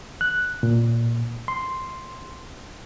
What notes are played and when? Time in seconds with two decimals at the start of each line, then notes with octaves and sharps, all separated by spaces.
0.21 F#6
0.63 A#2
1.48 C6